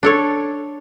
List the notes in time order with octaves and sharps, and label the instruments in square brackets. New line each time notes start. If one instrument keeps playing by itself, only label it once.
[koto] D4 A4 C#5